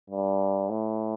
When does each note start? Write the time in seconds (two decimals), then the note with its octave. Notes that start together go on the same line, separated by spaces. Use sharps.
0.10 G2
0.69 A2